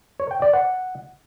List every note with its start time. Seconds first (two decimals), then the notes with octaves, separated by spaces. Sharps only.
0.20 C#5
0.31 G5
0.42 D5
0.53 F#5